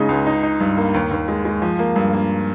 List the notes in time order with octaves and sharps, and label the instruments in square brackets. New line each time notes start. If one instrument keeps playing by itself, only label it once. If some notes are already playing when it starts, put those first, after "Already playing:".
Already playing: [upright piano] C#3 G#3 D#4
C#2
D#4
D#4
G2
A#3
D#2
D#2
G#3
G#3
F3
A#3
G2
A#3